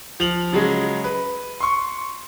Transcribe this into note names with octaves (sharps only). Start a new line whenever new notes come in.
F3 F7 F#7
C#3 F#3 G#3
B4
C6 C#6